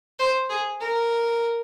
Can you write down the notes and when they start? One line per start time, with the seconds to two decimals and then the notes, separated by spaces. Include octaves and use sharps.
0.19 C5
0.50 G#4
0.80 A#4